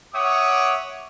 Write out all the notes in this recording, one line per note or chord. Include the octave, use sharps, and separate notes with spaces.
C#5 E5 F#5 D6 D#6